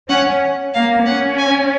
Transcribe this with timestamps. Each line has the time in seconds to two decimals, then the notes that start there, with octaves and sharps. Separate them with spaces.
0.09 C#4 F#5
0.74 A#3 F5
1.06 C#4 F#5
1.38 G#5